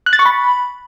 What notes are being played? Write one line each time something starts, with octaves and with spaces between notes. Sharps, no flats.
F#6
A6
C#6
B5